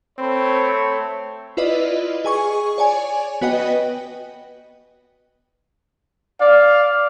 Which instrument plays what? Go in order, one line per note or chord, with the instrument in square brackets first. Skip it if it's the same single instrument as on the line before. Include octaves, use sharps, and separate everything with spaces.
[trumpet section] A3 C#5 B5 [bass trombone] C4
[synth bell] E4 F4 B4 D5 D#5
G#4 G#5 C#6
C#5 D5 G#5
B3 F#4 B4 D#5 G5
[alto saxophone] D5 [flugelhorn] F5